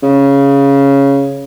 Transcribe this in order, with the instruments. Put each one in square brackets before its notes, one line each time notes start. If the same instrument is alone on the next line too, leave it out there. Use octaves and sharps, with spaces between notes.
[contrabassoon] C#3